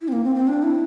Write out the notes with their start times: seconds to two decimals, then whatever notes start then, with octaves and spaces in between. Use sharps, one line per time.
0.02 E4
0.08 C4
0.12 A#3
0.24 C4
0.36 C4
0.48 D4
0.63 E4